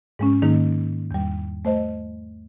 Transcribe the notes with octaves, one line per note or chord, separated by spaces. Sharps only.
G#2 G#3 C#4
G#2 D#3 A#3 D#4
E2 G3
A3 C5 D#5